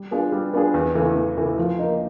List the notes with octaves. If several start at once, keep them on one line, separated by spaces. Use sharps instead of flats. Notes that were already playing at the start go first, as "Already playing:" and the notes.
Already playing: G3
B3 D4 F4 G#4
G3
B3 D4 F4 G#4
E2
C#3 E3 A3
E2
C#3 E3 A3
F3
A#3 D#4